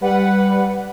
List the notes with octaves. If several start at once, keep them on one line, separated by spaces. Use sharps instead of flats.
G3 B4 F#5